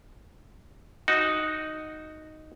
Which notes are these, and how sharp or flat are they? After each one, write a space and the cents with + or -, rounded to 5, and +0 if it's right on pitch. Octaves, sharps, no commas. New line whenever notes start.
D#4 +0 F#4 +0